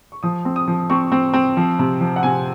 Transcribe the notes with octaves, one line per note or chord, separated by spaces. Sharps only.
C#6
F3 D#6
C4
D#6
F3
C4 C#6
C4
C4
F3
C3
F3
F#5
C3 G#5